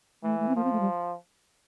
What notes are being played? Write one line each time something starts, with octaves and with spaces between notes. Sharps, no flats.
E3 A3
A3
C4
F3 A#3
C4
A3
G3